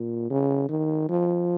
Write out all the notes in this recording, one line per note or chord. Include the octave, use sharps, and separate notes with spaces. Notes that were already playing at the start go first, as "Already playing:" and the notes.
Already playing: A#2
C#3
D#3
F3